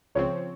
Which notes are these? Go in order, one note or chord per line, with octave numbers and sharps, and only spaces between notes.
C#2 C#3 F3 C4 C#5